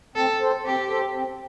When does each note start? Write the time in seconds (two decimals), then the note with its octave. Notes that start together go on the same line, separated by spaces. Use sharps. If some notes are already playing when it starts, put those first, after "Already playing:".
0.16 C4 A4
0.41 A4 C5
0.65 C4 G4
0.89 A4 C5
1.13 C4